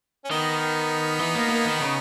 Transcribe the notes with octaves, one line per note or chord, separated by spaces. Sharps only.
C#4
D#3 B3 D#4
E3
A#3
A#3
D#3
C#3